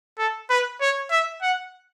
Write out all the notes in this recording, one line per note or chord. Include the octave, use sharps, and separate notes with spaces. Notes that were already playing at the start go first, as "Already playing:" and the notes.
A4
B4
C#5
E5
F#5